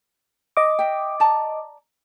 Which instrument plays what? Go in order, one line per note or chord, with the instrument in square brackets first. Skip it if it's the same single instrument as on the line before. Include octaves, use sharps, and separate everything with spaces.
[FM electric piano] D#5 D6
[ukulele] E5 G5
D5 A5 A#5